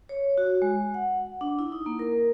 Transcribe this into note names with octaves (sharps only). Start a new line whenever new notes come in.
C#5
F#4
G#3
F#5
D4
E4
D#4
A#3
A#4